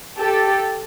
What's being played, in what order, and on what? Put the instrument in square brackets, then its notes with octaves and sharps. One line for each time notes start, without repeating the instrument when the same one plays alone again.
[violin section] G4 A4